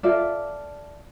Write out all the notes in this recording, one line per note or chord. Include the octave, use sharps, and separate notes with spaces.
F4 A4 D5 E5